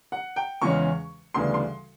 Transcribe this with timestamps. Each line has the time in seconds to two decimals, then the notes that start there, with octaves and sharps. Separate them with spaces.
0.12 F#5
0.36 G5
0.62 E2 C#3 E3 G#3 C#4 C#6
1.34 D2 C#3 E3 G3 B3 C6
1.54 C6